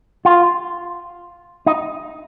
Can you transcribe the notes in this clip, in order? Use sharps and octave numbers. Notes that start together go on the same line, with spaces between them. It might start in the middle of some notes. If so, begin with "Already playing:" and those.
F4
D#4